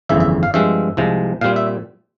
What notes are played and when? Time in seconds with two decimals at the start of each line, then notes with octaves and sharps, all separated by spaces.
0.09 G1 F2 C#3 E3 E5
0.20 E5
0.43 F5
0.54 G2 F3 G#3 C4 E5
0.97 C2 C3 F3 G#3
1.41 A#2 G3 C4 F5
1.56 E5